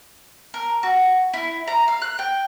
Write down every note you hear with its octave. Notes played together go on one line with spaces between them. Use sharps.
A#4
F#4
E4
A#5
F5
F#6
G5